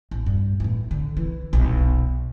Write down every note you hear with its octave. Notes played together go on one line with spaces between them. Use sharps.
A1
G2
A2 E3
D3
E3
D#1 B1